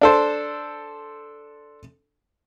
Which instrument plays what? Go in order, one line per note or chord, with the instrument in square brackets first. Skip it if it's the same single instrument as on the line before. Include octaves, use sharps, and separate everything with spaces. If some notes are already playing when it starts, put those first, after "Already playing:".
[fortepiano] D4 A4 C5